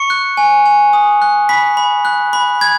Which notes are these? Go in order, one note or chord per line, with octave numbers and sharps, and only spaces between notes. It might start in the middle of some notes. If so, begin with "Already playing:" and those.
Already playing: C#6 C#7
F#6
G#5
G#5
D#6
F#6
B5 B6
B5
F#6
B5
B5 G#6